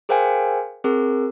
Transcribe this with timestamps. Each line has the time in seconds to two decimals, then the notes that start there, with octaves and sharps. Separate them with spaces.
0.09 G#4 A#4 C5 F5 G5 G#5
0.84 C4 G#4 A#4